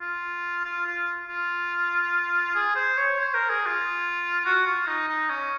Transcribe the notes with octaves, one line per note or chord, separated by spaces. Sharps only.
F4
F4
F4
F4
G#4
C5
C#5
C5
A#4
G#4
F4
F#4
F4
D#4
D#4
C#4